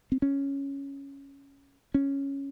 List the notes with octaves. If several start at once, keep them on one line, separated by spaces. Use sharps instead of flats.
C4
C#4
C#4